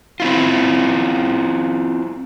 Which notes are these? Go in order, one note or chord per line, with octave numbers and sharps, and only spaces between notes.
C4 E4 F4